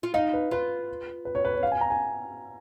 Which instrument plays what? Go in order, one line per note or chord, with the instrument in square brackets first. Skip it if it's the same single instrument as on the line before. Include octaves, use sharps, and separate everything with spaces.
[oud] F4
[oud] D#4 [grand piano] F5
[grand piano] B4
[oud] F4 [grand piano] B4
[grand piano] B4
C#5
B4
C#5
F5
G#5
A#5
G#5